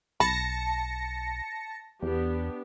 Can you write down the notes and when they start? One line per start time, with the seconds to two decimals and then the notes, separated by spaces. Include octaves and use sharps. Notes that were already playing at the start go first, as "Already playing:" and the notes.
0.20 B1 A5 B5 A#6 C#7
2.03 E2 B3 D4 G4